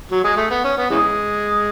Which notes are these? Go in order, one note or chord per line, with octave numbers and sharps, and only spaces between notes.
F#3
G#3
A3
B3
C#4
B3
C#3 E3 G#3